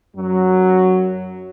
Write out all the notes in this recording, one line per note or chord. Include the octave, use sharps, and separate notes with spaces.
F#2 F#3